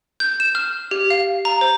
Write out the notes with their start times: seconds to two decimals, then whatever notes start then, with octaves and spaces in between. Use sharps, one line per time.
0.20 G6
0.40 E7
0.55 F6
0.91 G4
1.10 F5
1.45 A#5
1.61 C5